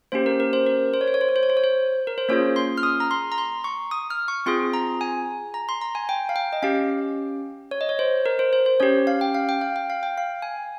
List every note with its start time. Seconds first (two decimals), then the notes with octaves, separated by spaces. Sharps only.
0.12 A#3 C#4 G4 C5
0.26 A#4
0.40 A#4
0.53 C5
0.66 A#4
0.94 C5
1.01 C#5
1.08 C5
1.14 C#5
1.21 C5
1.29 C#5
1.36 C5
1.43 C#5
1.50 C5
1.57 C#5
1.64 C5
2.07 A#4
2.18 C5
2.29 A#3 C#4 F4 G#4 C#5
2.56 C6
2.78 F6
2.83 D#6
3.00 A#5
3.11 C6
3.32 A#5
3.38 C6
3.64 C#6
3.91 D#6
4.10 F6
4.28 C#6
4.46 C4 F4 G#4 C6
4.74 A#5
5.01 G#5
5.54 A#5
5.69 C6
5.81 A#5
5.95 G#5
6.09 G5
6.29 F5
6.36 G5
6.53 D#5
6.62 C#4 G4 F5
7.71 C#5
7.81 D#5
7.89 C#5
7.99 C5
8.26 A#4
8.39 C5
8.53 C5
8.66 C5
8.80 C#4 G4 C#5
9.07 F5
9.21 G5
9.34 F5
9.49 G5
9.61 F5
9.76 G5
9.90 F5
10.03 G5
10.18 F5
10.42 G#5